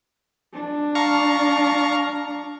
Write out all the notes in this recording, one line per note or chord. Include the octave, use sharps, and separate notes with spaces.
D4
F5 A#5 C#6